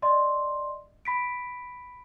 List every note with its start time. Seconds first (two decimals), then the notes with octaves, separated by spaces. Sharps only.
0.02 D5 D#5 C6
1.05 B5 B6 D7